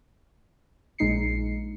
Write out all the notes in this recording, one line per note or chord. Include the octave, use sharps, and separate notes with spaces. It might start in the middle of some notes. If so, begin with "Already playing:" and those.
A#1 G#3 D#4 C7 C#7